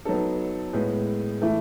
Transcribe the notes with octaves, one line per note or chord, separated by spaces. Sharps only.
F#3 B3 D#4 A4
A2 G#3 B3
E3 A3 E4